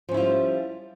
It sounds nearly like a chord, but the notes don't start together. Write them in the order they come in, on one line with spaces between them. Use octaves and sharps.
F3 C#4 E4 F4 G3